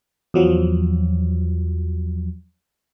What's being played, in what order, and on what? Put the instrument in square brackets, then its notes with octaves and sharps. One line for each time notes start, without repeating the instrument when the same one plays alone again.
[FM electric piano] E2 F3 F#3